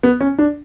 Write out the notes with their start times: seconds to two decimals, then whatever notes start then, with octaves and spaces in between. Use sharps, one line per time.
0.03 B3
0.21 C#4
0.38 D4